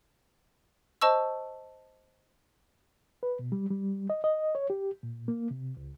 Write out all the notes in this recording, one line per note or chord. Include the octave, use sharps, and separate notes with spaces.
C5 D#5 A5 C#6 E6
B4
B2
G3
G3
D#5
D#5
C#5
G4
A#2
A#3
C3
C#2